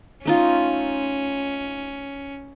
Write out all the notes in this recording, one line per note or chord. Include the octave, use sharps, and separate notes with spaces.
A3 C#4 D#4 F4